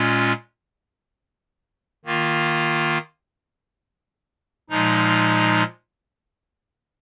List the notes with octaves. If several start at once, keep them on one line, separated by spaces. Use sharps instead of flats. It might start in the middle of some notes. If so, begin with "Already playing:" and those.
Already playing: A#2 G#3 C#4 F4
D#3 A#3 F4
A#2 F3 G#3 D#4